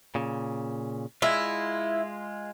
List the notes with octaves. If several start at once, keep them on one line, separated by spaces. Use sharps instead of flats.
A#2 C#3
G#3 E4 F4